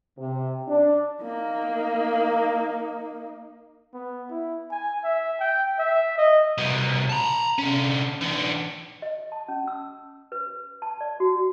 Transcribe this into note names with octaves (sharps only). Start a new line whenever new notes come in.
C3
D4
A#3 D#4
B3
E4
G#5
E5
G5
E5
D#5
C2 B2
A5 A#5
D3 C#4
D3 E3
D#5
A5
C#4
E6
B4
A5
D5
F#4